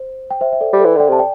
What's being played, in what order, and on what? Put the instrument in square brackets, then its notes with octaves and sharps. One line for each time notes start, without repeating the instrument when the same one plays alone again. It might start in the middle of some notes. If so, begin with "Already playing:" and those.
Already playing: [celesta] C5
G5
C5 E5
E5
A4 D5
[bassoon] G3
[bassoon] E3 [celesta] A4 D5
[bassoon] D3 [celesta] D5 G5
[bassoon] C3 [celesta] A5
[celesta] D5 G5